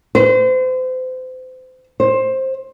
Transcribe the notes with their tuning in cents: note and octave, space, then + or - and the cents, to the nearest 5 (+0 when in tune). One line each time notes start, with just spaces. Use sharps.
C5 -35
C5 +15